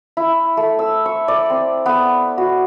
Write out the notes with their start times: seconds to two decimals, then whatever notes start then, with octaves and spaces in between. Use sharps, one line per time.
0.17 E4
0.57 A3
0.79 E6
1.06 C#6
1.28 D5
1.50 C4
1.86 B3
2.38 F#4